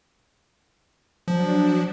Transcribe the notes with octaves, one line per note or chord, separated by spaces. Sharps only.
F3 F#3 D4